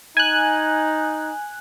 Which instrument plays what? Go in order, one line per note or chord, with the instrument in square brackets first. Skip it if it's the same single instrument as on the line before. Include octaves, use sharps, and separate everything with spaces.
[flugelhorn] D#4 [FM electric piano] G#5 F#6